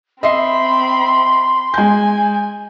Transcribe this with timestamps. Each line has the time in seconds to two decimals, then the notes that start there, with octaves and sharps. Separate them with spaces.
0.23 C4 D#5 E5 B5 C6 C7
1.74 G#3 G#5 G6